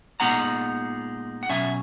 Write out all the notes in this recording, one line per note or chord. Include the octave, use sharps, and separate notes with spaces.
A#2 G#3 B3 D#4 F#5 A#5
F#5
B2 F#3 C#4 E5 G#5